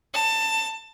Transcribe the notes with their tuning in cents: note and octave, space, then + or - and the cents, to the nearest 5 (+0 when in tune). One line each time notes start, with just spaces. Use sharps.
A5 +20